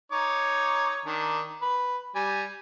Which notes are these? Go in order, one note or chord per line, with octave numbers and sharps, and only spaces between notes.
D#4 C#5 D6
D#3 D4
B4
G3 G#5